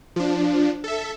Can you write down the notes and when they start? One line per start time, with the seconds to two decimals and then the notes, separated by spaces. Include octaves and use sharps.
0.16 F3 D4
0.84 A4 E5